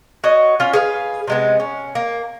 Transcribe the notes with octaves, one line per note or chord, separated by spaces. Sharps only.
F#4 C#5 D#5
C#4 F4
G#4 B4 F5
C3 G#3 B3
C#4
A#3